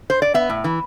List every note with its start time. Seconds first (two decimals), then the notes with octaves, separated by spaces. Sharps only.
0.10 C5
0.22 D5
0.34 B3 E5
0.50 A2
0.64 E3